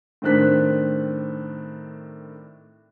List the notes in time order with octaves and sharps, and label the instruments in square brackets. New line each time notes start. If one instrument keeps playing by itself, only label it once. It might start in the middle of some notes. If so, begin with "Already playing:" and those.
[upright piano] A2 D#3 C4 D4 F#6 B6